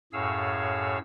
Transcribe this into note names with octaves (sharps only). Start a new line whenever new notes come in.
F#2 A2 G#4 C#5 F5 E6